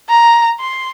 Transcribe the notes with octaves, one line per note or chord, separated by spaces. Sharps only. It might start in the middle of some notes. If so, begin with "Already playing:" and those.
A#5
C6